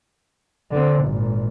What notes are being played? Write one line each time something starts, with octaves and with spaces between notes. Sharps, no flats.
D3 C4
G#1 A#2